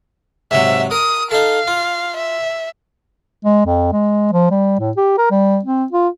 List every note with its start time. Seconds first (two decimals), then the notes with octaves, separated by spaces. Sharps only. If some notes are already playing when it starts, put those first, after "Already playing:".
0.51 G#2 C3 F#3 E5
0.91 A#4 D#6
1.31 D#4 A4 F5
1.67 F4
2.17 E5
3.45 G#3
3.66 F2
3.92 G#3
4.33 F3
4.51 G3
4.80 A2
4.97 G4
5.18 A#4
5.31 G3
5.65 C4
5.92 F4